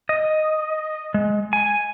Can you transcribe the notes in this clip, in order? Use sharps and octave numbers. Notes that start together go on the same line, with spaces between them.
D#5
G#3
G#5